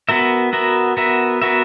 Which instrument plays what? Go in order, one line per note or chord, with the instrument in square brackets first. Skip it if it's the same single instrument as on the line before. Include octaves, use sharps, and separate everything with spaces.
[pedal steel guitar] B3 F#4 A#4 E5
B3 F#4 A#4 E5
B3 F#4 A#4 E5
B3 F#4 A#4 E5